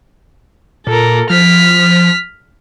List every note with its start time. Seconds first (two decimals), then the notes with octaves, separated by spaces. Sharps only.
0.87 A#2 A4 A#4
1.30 F3 F6 B6